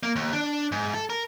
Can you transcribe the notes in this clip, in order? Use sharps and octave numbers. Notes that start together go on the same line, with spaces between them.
A#3
D#2
D4
G#2
A4
A#4